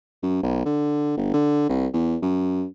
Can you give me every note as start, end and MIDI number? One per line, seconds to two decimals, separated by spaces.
0.23 0.42 42
0.43 0.63 35
0.66 1.17 50
1.17 1.30 31
1.34 1.64 50
1.69 1.87 36
1.94 2.17 40
2.22 2.65 42